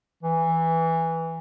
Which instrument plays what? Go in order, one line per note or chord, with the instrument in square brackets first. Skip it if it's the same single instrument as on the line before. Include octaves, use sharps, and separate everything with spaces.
[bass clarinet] E3